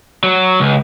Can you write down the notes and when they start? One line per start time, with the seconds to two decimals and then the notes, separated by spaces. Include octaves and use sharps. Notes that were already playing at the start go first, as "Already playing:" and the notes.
0.23 F#3
0.60 C#2